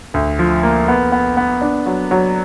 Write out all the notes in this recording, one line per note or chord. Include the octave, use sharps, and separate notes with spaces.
D2
F3
A#3
B3
B3
B3
D4
F#3
F#3